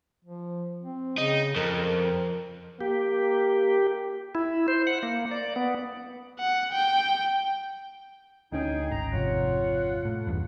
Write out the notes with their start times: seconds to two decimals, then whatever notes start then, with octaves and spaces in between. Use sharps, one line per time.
0.25 F3
0.83 C4
1.18 C#3 D#4
1.56 F2 A#4
2.81 A#3 G4
4.35 E4
4.68 C5
4.87 F#5
5.03 A#3
5.31 D5
5.56 B3
6.40 F#5
6.72 G5
8.52 D2 D3 C#4 D#4 G#4 G5
8.91 G#1 A#5
9.13 F2 C3 F4 C#5 F#5
10.05 A2
10.27 A1 E2 G2